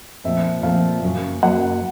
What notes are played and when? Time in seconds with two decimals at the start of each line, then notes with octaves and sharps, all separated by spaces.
0.24 A#2 F3 A3 C4 E5
0.63 A#2 F3 A3 C4 F5
1.03 F#2 C#3 F#3 A#3
1.42 F#2 C#3 F#3 A#3 F#5